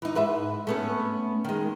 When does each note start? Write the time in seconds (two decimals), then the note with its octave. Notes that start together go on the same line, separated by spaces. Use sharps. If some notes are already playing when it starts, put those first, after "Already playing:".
0.02 E3 D#4
0.15 G#2 B4 E5
0.67 A3 B3 C#4
1.45 D#3 G#3